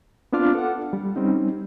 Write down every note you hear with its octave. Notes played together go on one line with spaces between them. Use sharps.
B3 C4 D4 F4 D6 F6
A4 F#5
G3
G3 C4 C#4 D#4